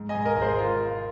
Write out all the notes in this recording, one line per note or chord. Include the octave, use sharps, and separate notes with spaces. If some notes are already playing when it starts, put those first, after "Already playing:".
Already playing: G#2
D#5 G#5
G#2
A#4 D#5
G#1
G#4 C5
F4 A#4
F4